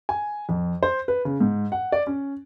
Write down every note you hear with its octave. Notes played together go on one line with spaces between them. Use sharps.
G#5
F2
C5
B4
C#3
G#2
F#5
D5
C#4